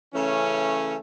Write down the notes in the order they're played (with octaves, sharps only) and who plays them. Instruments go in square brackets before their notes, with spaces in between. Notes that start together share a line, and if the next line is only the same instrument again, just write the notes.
[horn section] C#3 E3 A3 C#4